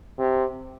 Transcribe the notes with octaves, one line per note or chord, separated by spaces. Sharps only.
C3